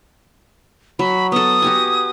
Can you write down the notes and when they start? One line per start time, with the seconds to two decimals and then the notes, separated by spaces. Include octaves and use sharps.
0.99 F#3 B5
1.32 B3 A4 D#6
1.62 F#4 G4 G#5